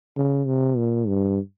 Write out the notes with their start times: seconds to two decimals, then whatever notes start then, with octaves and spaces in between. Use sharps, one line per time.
0.17 C#3
0.47 C3
0.77 A#2
1.08 G2